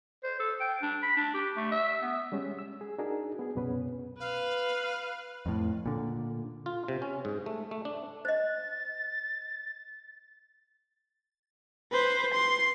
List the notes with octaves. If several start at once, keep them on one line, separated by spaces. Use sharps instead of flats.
C5
A4
G5
D4
B5
D4
G4
A3
E5
B3
G3 G#3 C#4
E6
G#4
D4 D#4 F#4 G#4 A#4
B3 G#4
C2 F#2 B2 B3 C#4 B4
B4 F5
F2 A2
A#2 D3
F4
C3
C#4
G#2
A3
A3
D4
C5 D#5 A6
B4 C5
C6